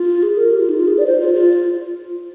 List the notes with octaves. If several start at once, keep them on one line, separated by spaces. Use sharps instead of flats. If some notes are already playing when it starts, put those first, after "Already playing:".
Already playing: F4
G#4
A#4
G4
F4
D#4
F4
G#4
D5
C5
F4
F4